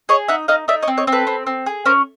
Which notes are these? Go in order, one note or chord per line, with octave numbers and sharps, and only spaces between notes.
G#4 C#5 D#5
D#4 E5 F#5
D#4 D#5 F5
D#4 D5 E5
C#5 D#5
C4
C#5 D#5
C4
A4 B4
C4
C4
G#4
C#4 A#4 C5